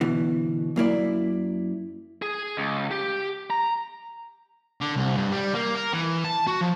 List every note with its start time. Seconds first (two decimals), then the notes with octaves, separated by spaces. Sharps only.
0.01 D2 B2 E3
0.76 F#2 A#3 E4 D5
2.22 G#4
2.57 C#2
2.91 G4
3.50 A#5
4.81 D3
4.97 C2
5.16 G2
5.31 G3
5.54 A#3
5.75 A#4
5.93 E3
6.24 A5
6.47 F#4
6.61 F3